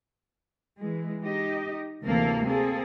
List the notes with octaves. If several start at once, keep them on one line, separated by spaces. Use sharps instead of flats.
E3 G#3
D#4 G4 D#5
D2 C3 E3 A#3 A4 F5
A#3 C4 G#4 A4